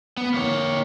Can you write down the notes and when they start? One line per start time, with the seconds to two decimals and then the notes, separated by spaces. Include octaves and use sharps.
0.17 B3
0.34 A#3 C#5